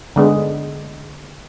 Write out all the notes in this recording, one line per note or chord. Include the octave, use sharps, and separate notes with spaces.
D3 G#3 B3